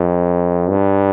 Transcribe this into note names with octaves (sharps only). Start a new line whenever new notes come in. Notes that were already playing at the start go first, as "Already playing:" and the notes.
Already playing: F2
G2